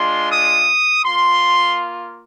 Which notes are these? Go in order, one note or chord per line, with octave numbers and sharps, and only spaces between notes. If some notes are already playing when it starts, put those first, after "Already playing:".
Already playing: G#3 D4 F4 C6
D#6
A#3 F4 C6